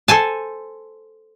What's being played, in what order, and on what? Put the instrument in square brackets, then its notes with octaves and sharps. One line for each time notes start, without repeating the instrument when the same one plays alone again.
[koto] A4 C5 G#5 A5